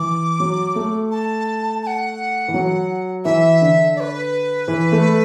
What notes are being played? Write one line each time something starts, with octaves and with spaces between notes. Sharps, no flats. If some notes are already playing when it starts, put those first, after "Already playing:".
Already playing: E3 D6
F#3
A3
A5
A5
F#5
E3
F#3
E3 E5
D3
D5
B4
E3
A3